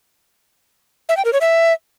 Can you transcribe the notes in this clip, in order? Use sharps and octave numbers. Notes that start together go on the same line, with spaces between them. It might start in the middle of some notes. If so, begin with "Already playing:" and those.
E5
G5
A#4
C#5
E5